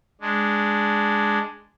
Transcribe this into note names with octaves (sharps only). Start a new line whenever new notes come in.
G#3 D4